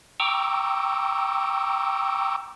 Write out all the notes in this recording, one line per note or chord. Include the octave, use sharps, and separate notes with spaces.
G5 A#5 C#6 D6 E6